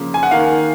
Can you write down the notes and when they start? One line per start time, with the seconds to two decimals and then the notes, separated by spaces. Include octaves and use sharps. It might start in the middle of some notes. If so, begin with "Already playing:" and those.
Already playing: C#3 F3 A#3
0.14 G#5
0.23 F#5
0.31 D#3 A#3 F5